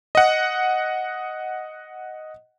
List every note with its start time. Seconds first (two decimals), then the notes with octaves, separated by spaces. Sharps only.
0.15 D#5 F#5